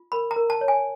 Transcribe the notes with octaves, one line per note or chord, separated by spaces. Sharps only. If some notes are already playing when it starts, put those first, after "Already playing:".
Already playing: F4
A#4 B5
A#5
A#4
A5
C#5
G#5